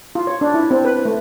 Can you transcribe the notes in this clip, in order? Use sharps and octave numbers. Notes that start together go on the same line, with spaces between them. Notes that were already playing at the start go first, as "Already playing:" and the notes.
F4
C#5
D4
E4
C4
B4
A3